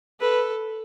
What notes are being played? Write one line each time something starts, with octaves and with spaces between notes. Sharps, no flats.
A4 B4